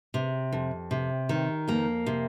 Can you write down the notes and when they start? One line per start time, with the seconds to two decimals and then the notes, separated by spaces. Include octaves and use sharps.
0.14 C3
0.52 F2
0.91 C3
1.29 D#3
1.68 F2 A#3
2.06 C3